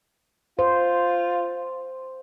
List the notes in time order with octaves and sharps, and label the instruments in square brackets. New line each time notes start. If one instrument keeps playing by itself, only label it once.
[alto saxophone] F4 [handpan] C5